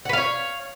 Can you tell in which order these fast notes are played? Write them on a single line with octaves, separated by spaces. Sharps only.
F#5 B4 F5 C#5